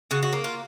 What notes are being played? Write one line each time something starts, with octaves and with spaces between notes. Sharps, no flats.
C#3 F#4
F#4
A#3
F4